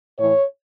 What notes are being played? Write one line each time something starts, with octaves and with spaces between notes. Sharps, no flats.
A2 E3 C#5